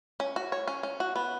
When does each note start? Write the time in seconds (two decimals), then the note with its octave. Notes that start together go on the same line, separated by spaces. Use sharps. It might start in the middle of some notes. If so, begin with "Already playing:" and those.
0.20 C#4
0.36 F#4
0.52 C#5
0.68 C#4
0.83 C#4
1.00 F#4
1.16 B3